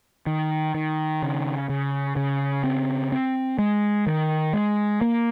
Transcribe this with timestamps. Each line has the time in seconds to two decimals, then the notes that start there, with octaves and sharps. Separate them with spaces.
0.27 D#3
0.74 D#3
1.22 C#3
1.70 C#3
2.16 C#3
2.64 C4
3.12 C4
3.59 G#3
4.07 D#3
4.53 G#3
5.01 A#3